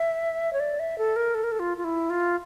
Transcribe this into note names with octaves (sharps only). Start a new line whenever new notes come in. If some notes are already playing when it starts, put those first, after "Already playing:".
Already playing: E5
C#5
D5
E5
A4
A#4
A4
A#4
A4
F4
F4
E4
F4